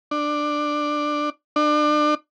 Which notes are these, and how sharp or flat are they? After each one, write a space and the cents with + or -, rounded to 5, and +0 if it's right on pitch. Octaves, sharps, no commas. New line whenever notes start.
D4 +10
D4 +30